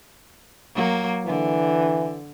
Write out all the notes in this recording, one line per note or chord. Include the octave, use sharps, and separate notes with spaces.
F#3 A#3
D3 E3